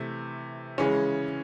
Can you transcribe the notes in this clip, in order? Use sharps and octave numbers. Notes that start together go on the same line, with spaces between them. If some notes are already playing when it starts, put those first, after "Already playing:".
Already playing: C3 E3 A3
C#3 E3 G#3 C#4